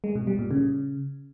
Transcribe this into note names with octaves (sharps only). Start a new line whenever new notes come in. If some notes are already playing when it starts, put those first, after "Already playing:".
G#3
B2
G3
A#2
C#3